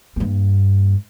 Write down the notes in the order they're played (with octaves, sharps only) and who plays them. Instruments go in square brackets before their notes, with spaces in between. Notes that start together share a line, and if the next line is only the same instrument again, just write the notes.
[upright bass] G2 A#3